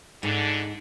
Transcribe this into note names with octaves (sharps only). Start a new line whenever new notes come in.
F2 G#2 D3